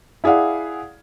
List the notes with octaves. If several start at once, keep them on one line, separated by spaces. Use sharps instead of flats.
E4 G#4 D5 F5 F#5